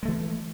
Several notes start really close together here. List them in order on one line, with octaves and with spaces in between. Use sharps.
G#3 A3 E3